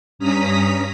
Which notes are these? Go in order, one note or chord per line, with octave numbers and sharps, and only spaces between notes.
G2 C#4 A#5 D#6 B6